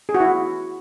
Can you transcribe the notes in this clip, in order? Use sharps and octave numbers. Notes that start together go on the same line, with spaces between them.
G#4
F#4
E4